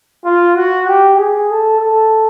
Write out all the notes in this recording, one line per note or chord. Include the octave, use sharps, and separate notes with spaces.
F4
F#4
G4
G#4
A4
A4